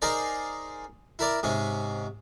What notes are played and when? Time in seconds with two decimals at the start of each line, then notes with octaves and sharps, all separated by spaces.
0.02 D#4 G#4 A#4 C5 D5
1.19 E4 A#4 D5
1.43 G#2 C3 C#4